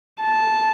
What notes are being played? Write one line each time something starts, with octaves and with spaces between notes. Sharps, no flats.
A5